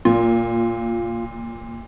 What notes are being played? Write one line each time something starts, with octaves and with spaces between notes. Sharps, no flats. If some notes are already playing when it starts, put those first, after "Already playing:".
A#2 F4